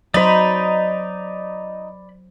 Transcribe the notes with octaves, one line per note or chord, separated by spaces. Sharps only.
F#3 D#4 C5 D5 B5